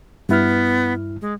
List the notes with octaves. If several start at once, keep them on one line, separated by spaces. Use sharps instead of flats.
G2 B3 E4 F6
G#3